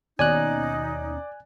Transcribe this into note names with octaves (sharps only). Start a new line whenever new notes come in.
D#2 B2 C#4 D#4 D5 G#5 F#6